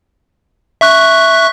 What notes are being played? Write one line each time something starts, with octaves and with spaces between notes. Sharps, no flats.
E5 C#6 F#6